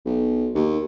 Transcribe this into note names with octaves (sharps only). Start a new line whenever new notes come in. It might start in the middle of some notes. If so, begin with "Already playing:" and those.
B1
D#2